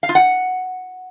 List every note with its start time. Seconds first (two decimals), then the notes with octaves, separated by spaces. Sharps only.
0.03 F5
0.09 F4
0.15 F#5